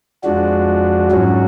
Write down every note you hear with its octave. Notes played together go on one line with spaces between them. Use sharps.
F2 F3 G#3 D4 F#4
G#2 F#3 C#4 F#4